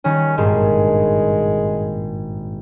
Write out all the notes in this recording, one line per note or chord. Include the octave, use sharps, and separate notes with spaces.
D#3 G3 C#4 G#4
G#1 G2 A#2 G#3